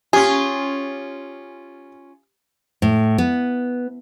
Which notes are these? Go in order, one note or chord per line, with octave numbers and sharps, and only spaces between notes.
C#4 F4 G4 G#4
A2
B3